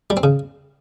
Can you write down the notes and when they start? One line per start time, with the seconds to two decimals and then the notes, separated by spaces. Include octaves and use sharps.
0.10 G3
0.17 C4
0.23 C#3